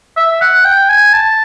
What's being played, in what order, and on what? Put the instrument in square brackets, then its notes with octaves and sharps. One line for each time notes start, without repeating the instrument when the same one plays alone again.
[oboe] E5
F#5
G5
G#5
A5